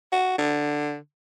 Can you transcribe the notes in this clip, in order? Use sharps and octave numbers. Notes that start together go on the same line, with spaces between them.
F#4
D3